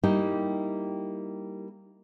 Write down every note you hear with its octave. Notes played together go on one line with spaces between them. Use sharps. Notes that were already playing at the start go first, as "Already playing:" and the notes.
G3 A#3 D#4 E4 G4